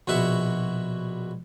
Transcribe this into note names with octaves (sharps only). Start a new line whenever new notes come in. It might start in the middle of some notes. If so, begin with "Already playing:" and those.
A#1 B2 F#4 E5 C#6